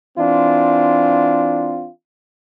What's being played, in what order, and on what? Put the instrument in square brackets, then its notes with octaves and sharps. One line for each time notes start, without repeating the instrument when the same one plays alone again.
[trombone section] E3 C4 D4 F4